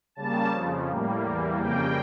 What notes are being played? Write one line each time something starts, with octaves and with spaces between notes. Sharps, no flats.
C#3 G3 A#3 A5
F2 C#3 F3
A2 G3 A#3
E2 E3 G3 A#3
F2 C#3 G3 A#3 G5